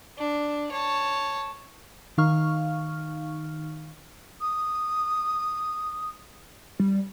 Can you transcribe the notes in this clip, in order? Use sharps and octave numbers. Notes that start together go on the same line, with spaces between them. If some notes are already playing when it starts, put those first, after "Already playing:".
D4
C#5 A5
D#3 D#4 F5 C#6 F6
D#6
G3